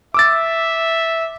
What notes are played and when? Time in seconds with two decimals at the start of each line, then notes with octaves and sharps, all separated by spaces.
0.14 E5 D6 E6 A6